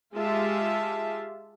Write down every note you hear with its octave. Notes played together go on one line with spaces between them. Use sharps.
G#3 F4 G4 E5 A5